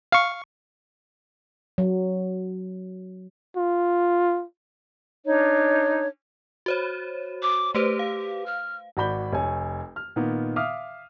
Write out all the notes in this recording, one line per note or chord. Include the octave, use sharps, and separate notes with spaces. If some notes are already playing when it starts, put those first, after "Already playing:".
F5 C#6
F#3
F4
D4 D#4 C#5
F#4 C5 C#5
D6
A3 G4 B4 C5
F5
F6
G#1 F#4 D5 B5 G6 G7
F1 C#5 G#5
F6
A#2 D#3 B3
E5 F5 D6 D#6 F6